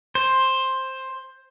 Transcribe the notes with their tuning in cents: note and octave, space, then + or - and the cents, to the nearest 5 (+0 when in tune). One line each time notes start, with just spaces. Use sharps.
C5 +10